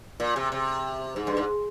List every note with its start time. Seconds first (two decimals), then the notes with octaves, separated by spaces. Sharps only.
0.20 A#2
0.36 C3
0.52 C3
1.16 G#2
1.27 G2
1.37 G#2